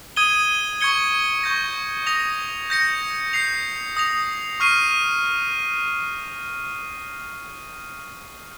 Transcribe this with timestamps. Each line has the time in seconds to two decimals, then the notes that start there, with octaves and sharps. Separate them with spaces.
0.16 D#6 G#6 D#7 G7
0.81 C#6 G#6 C#7 G7
1.43 C#6 G6 A#6
2.06 D#6 A#6 F7
2.70 G6 A#6 C#7
3.33 G6 C7 F7
3.97 D#6 A#6 F7
4.60 C#6 F6 C7 D#7